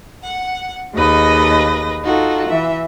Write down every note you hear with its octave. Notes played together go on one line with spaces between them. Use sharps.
F#5
D#2 G#4 B4 D#5 A#6
D#4 F4 F#4 A4
E3 E5